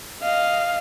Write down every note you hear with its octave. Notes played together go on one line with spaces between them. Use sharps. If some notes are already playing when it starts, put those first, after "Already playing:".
D#5 F5